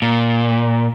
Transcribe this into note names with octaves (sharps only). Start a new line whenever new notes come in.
A#2